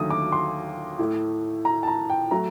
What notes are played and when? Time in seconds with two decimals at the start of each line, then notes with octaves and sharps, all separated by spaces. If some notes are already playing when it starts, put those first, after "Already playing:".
Already playing: D#2 D3 F#3 A3 D#6
0.10 D6
0.32 C6
0.99 A2 A3
1.65 A#5
1.83 A5
1.88 A#5
2.10 G5
2.31 F#3 A3 A#5